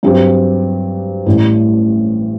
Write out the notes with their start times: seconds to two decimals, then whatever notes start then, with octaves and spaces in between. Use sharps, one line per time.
0.03 G2 F#3 C4 G4
1.26 A1 A2 G3